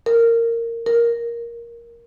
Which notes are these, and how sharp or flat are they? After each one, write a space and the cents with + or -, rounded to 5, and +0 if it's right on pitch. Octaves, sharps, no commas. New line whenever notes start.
A#4 -15
A#4 +10